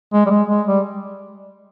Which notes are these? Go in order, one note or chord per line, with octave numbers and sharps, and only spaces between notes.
G#3
G3
G#3
G#3
G3